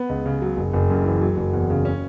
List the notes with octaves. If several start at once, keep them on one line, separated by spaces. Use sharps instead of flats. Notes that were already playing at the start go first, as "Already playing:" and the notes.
Already playing: B3
C#2
C#3
F#3
F#1
F#1
F#2
E3
F#3
F#1
E2
C#3
C#4